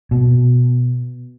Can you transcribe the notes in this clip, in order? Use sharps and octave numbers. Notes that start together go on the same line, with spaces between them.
B2